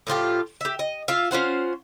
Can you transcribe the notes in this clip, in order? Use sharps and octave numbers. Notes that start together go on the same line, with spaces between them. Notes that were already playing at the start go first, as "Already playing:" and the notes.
A2 F3 F4 G4
G4 E5
D#5
F4 E5 F5
C#4 F4 C5 F#5